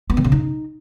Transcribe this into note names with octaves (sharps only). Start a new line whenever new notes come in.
B3
D#3
C#3
D#4